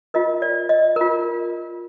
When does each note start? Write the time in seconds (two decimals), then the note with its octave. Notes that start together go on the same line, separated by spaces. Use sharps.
0.14 F4 A#4 D#5
0.42 D5
0.69 D#5
0.96 F4 A#4